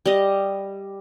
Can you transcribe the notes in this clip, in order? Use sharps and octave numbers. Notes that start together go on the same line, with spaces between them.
G3 D#5